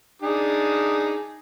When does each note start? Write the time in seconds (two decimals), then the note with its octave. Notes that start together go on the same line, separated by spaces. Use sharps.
0.22 D4 D#4 G#4